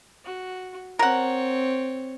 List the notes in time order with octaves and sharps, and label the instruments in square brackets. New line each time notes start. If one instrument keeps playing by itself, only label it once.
[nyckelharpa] F#4
[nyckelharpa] C4 C#5 [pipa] A#4 F#5